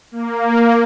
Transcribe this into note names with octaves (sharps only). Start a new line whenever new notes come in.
A#3